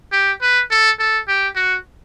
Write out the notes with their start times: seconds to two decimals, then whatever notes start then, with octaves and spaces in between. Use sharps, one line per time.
0.12 G4
0.42 B4
0.71 A4
0.99 A4
1.28 G4
1.56 F#4